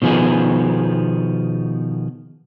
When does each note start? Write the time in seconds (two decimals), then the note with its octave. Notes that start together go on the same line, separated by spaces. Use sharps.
0.02 B2 D#3 F3 B3 G#4